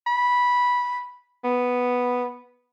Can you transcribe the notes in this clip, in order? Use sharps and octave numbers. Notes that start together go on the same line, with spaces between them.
B5
B3